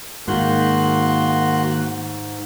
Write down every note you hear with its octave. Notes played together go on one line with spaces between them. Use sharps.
G#2 D#3 A#3 F#4 C6 F#6